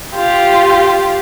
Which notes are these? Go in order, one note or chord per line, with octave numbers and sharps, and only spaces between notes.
F4 G4